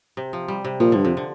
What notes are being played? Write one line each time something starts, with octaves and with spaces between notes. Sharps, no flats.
C3
F3
G3
C3
A#2 F3
G2 D3
F2 C3
D3